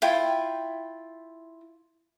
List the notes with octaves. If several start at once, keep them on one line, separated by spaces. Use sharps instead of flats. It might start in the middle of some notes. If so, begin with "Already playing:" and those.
E4 F4 G5